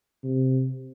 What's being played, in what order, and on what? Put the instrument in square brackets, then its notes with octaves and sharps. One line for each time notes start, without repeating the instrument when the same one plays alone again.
[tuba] C3